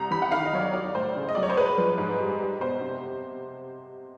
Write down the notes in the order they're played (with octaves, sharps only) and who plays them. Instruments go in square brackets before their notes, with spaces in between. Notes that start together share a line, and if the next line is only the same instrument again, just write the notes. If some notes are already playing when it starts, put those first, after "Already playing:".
Already playing: [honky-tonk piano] C2 C3 A#5
E3 B5
F#5
D#3 F5
D#5
F#3 C#5
D5
F#3 D5
A2 C5
C#3
D#5
F#3 D5
C#5
C5
G#3 B4
F3
G#2
G3
G3
B2 C5
C3